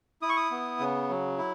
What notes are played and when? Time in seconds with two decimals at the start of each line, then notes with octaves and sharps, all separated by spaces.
0.22 E4 D#6
0.29 C#6
0.37 D#6
0.51 B3
0.80 C#3
1.09 F#3
1.38 E4